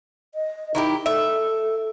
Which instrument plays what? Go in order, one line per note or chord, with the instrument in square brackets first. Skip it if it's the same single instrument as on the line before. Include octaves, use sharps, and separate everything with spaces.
[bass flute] D#5
[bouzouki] D#3 E4 G4 [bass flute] D#4
[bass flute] A4 [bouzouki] E5